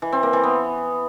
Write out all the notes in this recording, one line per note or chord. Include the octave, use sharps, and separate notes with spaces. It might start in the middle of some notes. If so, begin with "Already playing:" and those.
E3
C4
A#3
E3
B3